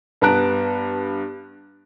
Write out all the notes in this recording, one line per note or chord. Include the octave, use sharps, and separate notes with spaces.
G2 B3 A5 A#5 F#6 D7